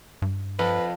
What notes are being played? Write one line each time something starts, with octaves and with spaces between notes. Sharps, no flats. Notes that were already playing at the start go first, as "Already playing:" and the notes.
G2
F2 B4